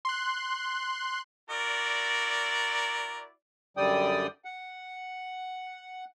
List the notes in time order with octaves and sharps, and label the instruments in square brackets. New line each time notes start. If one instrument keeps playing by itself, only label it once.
[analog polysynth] C6 F#6
[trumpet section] E4 F#4 D5 [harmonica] A#4
[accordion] F#2 D3 G3 D5 G5 D#6
F#5